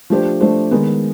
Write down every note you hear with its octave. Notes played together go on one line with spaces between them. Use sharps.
F3 A3 D4 G4 C5
F3 A3 D4 G4 C5
D#3 G#3 B3